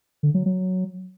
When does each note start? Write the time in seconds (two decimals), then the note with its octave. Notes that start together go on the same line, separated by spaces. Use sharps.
0.23 D3
0.34 F#3
0.46 F#3